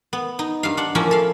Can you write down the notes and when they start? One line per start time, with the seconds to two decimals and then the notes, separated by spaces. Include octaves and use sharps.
0.13 B3
0.39 D#4
0.63 G2 F5
0.77 D4 F#5
0.95 F3 A#3 C#4 E4
1.11 A4 F5